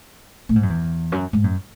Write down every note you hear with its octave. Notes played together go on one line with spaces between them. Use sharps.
A2
G#2
F#2
E2
F#2
G#2
F#2